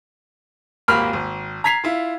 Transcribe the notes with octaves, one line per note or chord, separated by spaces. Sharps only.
D#1 G#1 A#3 B5 F6
G#1
A#5 G#6 B6 C7 F7
E4 F4